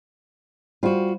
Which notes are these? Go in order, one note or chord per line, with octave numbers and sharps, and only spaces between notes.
G3 F4 F#4 C5